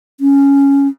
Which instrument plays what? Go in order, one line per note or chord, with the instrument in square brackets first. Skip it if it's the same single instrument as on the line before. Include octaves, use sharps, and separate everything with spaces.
[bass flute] C#4